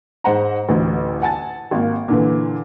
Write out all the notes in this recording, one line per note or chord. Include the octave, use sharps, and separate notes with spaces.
G#2 C5 F#5 A#5
A1 D2
F#5 G#5 A5 A6
G#1 A#3
A#2 D3 E3